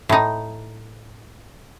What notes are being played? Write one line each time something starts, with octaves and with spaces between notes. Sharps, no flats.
A2 D#4